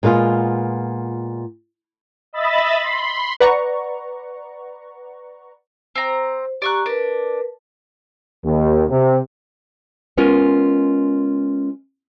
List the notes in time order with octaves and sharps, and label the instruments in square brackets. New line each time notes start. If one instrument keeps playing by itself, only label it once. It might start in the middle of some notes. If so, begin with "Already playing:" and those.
[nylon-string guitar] A#2 G#3 B3 F4
[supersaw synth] D#5 E5 B5 A6
B5 C6
[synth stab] B4 D5 F#5 A#5 C#6
[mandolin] C4 A#5 [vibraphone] C5
[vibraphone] G4 A#5 [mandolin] D5 C#6 F#6
[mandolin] D4 [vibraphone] A#4 B4
[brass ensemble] D#2
C3
[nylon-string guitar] G#3 B3 C#4 F4 A#4